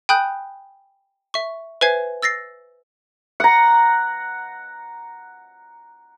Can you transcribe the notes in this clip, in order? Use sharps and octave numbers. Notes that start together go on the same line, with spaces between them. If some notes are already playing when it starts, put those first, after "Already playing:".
G5 G#5 B5 D#6 F#6 G6
E5 C#6
B4 C5 E5 G#5 G#6 C7
E6 A6 A#6 C7
F#5 A#5